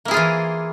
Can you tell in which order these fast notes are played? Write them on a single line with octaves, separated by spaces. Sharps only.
A#3 E4 G#4 F4 E3